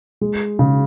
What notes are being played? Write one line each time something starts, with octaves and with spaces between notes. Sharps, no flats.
G#3
C#3